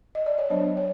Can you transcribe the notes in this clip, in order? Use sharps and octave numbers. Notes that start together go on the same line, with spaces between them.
D#5
D5
C#5
F#3 B3 D4 C5
C#5